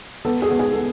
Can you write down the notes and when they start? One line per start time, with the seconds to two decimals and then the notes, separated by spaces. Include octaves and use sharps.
0.25 B3 A4
0.42 G#4
0.51 B3
0.60 G#4
0.73 A4